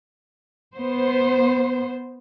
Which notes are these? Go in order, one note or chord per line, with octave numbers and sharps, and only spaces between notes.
B3 C5